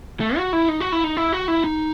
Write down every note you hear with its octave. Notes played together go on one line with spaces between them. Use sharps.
A3
F#4
E4
D#4
F#4
E4
D#4
E4
F#4
E4
D#4